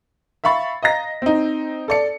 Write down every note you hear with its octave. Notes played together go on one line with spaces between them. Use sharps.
E5 F5 B5 C#6 A6
D#5 F5 A#5 A#6 B6
C4 D#4
A4 D5 C#7